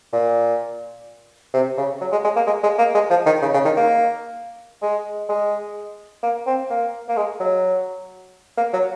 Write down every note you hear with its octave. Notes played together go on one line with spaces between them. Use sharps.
A#2
C3
C#3
F#3
G#3
G#3
A#3
G#3
G#3
A#3
G#3
F3
D#3
C#3
C#3
D#3
A#3
G#3
G#3
A#3
C4
A#3
A#3
G#3
F#3
A#3
F#3